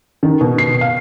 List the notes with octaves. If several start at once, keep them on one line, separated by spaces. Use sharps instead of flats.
D#3
B2
C7
F5